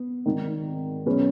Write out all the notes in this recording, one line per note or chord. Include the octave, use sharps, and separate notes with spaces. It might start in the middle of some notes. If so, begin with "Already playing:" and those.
Already playing: B3
G#1 G#2 D#3
B2 F#3 C#4 G#4 B4